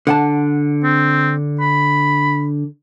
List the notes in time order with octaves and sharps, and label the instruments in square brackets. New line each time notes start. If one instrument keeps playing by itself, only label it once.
[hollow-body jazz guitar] D3 F#5 A5
[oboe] C4
B5